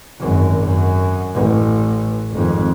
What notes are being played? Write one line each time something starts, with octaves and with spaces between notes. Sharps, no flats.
G#1 F#2
F#2
A1
G#1 F2